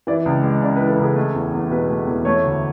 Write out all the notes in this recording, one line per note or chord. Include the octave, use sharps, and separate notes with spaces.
E3 D5
C#2
G#3
C#3 D5
E3 B4
A4
C#2 G#4
A3
E2
E2
B2 B4
A3
E2
A3 C#5
D2